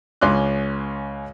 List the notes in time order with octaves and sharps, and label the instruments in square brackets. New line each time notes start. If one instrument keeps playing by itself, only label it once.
[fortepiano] C#2 C#4 C6 D6 F#6